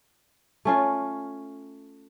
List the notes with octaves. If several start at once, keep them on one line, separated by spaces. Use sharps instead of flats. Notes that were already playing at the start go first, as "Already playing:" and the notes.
A3 C#4 F4